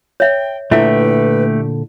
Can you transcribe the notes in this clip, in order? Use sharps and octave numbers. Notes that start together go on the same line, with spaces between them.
C#5 E5 G5
A#2 D3 A3 E4 G4 B4 E5